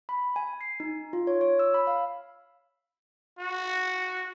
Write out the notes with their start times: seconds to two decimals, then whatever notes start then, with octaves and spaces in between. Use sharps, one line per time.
0.09 B5
0.36 G#5
0.61 C7
0.80 D#4
1.13 F4
1.27 C#5
1.41 C#5
1.59 E6
1.74 B5
1.87 F5
3.39 F#4